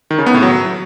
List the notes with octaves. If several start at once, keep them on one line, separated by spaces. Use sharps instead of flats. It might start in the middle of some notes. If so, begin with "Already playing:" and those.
D#3
C#3
B3
A2
F#3